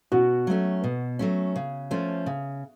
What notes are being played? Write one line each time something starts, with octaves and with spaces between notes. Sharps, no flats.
B2 F#4
F#3 A3 C#4
B2
F#3 A3 C#4
C#3
F3 A3 C#4
C#3